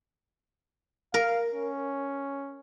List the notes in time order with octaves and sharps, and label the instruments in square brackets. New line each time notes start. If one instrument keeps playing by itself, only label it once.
[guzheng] A#4 [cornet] F5
[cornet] C#4